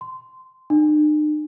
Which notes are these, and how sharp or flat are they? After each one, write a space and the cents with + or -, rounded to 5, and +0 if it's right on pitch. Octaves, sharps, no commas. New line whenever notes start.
C6 -15
D#4 -45